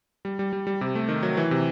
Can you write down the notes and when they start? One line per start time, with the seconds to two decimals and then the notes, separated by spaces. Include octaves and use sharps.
0.25 G3
0.39 G3
0.53 G3
0.67 G3
0.81 C3
0.95 A3
1.09 D#3
1.23 F#3
1.37 E3
1.51 C3